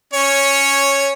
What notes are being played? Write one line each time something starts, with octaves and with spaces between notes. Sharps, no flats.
C#4 C#5